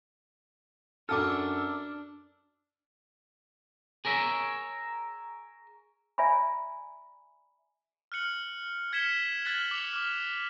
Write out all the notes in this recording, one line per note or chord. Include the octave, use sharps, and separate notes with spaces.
F#2 D4 A4 D6 E6 F6
G#4 A#4 C#5 E5
D5 E5 G#5 A#5 B5
F6 F#6 C#7 F#7
F6 G#6 B6 C#7 E7 G7
F6 F#6 G#6 A6 B6 F#7
D6 C#7 F7
D6 F6